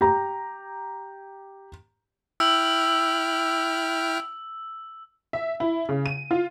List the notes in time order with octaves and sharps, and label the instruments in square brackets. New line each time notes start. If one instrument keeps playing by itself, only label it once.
[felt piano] G4 A#5
[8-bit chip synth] E4 G5 F6 [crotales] E6
[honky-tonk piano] E5
E4
C#3
D#7
F4